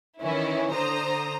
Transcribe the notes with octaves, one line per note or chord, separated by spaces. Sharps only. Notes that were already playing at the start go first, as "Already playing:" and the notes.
D#3 E3 C#4 E4
D3 C5 A#5 D#6